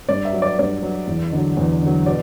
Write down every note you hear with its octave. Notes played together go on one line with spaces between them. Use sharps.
G2 D5
E5
F#3
D5
G2 D5
F#3
E2
D3 F#3
E2
D3 F#3
B2 D5